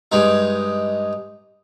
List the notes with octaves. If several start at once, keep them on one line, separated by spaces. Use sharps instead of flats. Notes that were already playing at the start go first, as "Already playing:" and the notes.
G2 G#3 D#4